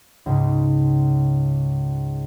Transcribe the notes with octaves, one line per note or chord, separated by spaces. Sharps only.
C#2 G#2 C#3